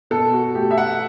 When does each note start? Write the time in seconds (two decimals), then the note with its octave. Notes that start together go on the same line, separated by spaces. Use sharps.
0.10 B2 A4
0.33 F#4
0.55 A3 G4
0.71 E5
0.77 F#5